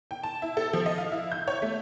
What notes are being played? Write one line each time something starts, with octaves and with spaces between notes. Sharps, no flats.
G5
A5
E4
A4
F3
D#5
F5
E4
G6
C#5
A3